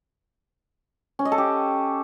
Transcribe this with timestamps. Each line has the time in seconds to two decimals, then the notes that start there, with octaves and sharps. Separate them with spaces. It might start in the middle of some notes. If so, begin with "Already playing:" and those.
1.19 C#4
1.25 D#5
1.32 A4
1.38 G4